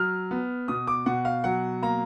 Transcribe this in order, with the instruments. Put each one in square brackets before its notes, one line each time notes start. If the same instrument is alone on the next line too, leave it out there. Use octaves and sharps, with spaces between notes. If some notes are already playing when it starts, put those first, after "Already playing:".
Already playing: [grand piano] F#3 F6
B3
B2 D#6
D6
B2 F#5
F5
F#3 F#5
A#3 A#5